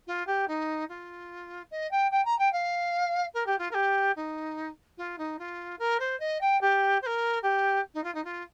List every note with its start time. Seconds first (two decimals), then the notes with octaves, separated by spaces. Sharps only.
0.07 F4
0.27 G4
0.48 D#4
0.89 F4
1.71 D#5
1.91 G5
2.11 G5
2.25 A#5
2.39 G5
2.52 F5
3.34 A#4
3.46 G4
3.58 F4
3.71 A#4
3.74 G4
4.16 D#4
4.97 F4
5.18 D#4
5.39 F4
5.79 A#4
6.00 C5
6.20 D#5
6.41 G5
6.61 G4
7.02 C5
7.06 A#4
7.42 G4
7.94 D#4
8.04 F4
8.14 D#4
8.24 F4